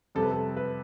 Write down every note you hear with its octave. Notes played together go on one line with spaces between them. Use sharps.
F2 C3 G3 C4 A4
B4
A4
B4